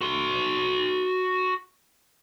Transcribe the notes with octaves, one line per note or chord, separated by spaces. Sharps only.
F#4 C6